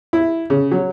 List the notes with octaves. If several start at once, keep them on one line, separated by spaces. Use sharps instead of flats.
E4
C#3
F#3